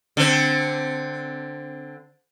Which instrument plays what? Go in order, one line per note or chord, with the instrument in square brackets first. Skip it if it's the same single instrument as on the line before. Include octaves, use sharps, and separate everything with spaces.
[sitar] D3 C4